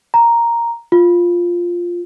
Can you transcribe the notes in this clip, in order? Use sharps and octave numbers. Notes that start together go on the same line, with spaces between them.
A#5
F4